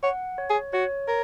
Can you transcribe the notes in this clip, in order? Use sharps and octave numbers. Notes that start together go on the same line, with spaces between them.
C#5 F#5
C#5
G#4
F#4 C#5
A#4 C#5